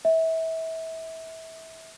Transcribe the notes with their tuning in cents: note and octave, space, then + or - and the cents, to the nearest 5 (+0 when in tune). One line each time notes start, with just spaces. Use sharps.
E5 -30